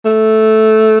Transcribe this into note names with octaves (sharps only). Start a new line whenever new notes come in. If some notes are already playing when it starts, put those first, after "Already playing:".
A3